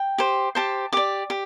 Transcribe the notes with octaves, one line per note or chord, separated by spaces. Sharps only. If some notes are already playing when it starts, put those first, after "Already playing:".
Already playing: G5
G4 C5
G4 C5 A5
G4 D5 D6
G4